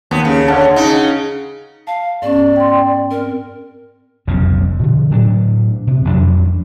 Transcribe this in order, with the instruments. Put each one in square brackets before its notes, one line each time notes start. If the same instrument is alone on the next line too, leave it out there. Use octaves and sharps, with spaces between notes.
[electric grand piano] D#2 [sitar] B3
[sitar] C#3
[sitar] D3 [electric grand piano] C#5 F#5 A5
[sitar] C#3 D#4
[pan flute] F5 [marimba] A5
[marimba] G#2 B3 C#4 [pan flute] D5
[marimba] G5 C6
[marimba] C4 [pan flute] A#4
[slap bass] F1 B1 F2 C#3
B2 D3
A2 F#3 D4
C3
A1 F2 F#3 D4